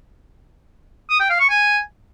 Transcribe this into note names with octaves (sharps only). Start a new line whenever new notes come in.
D#6
G5
F5
C#6
G#5